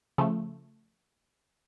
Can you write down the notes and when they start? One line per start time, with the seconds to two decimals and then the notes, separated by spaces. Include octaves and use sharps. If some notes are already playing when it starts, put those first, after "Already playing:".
0.18 C#3 F3 A3